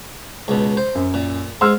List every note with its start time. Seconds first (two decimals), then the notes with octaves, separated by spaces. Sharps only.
0.48 C#2 B2
0.77 C5
0.95 F#2
1.14 A#2
1.61 G#2 C6 E6 F6